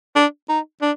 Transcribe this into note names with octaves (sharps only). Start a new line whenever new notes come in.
D4
D#4
D4